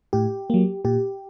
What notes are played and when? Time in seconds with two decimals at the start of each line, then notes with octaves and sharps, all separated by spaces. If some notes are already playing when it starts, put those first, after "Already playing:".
0.13 A2 G4
0.50 F#3 A#3
0.85 A#2 G4